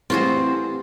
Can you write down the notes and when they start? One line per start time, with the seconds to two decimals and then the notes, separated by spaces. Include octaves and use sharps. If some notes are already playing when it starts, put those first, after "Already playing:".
0.10 E3 G3 A3 C4 F4 F#4 G#4 C5